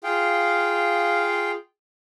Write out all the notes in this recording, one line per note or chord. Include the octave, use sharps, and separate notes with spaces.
F4 G#4 F5 G5